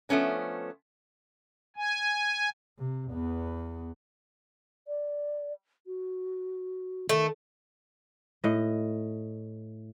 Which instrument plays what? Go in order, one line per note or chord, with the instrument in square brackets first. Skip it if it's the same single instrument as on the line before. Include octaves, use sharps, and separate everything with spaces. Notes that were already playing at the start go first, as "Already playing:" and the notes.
[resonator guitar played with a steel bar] F3 A3 B3 C#4 D4
[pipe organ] G#5
[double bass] C3
E2 B3
[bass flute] D5
F#4
[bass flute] D#3 [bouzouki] A3
[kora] A2 D#5